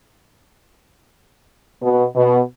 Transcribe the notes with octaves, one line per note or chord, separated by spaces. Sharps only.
B2
B2